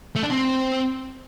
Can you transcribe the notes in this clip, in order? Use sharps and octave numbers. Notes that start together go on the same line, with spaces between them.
A3
D4
C4